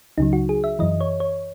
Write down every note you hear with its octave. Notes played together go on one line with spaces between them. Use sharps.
C#2 C#3 F#3 D#4
F#4
G#4
E5
F#2 E3 D#5
C#5
C#5